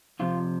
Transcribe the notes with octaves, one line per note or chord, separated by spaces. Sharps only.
F2 C3 F3 F4